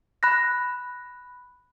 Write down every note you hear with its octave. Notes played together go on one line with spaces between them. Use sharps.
B5 F#6 A#6